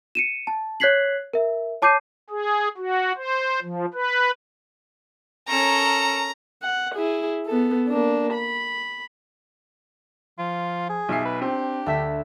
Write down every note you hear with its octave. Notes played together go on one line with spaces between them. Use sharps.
C#7 D#7 E7
A5
C#5 F#6 G#6 B6 C7 F#7
A#4 E5
C#5 A5 D6 G6 C7 D#7
G#4
F#4
C5
F3
B4
C#4 A4 A#4 A#5
F#5
E4 G#4
B3 A4
A#3 D4
B5
F3 F4
G#4
B1 E5 C7
B4
C4 D4 G4
D2 E5 A5 B6